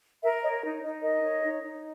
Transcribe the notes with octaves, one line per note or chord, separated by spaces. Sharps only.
A#4 E5
C#5 D#5
D#4
D#4 D#5
A#4 D#5
C#5
D#4
D#4